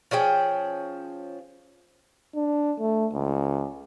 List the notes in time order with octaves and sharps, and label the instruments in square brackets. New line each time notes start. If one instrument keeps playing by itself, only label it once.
[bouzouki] F3 C#4 G#4 G5
[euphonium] D4
A3
C#2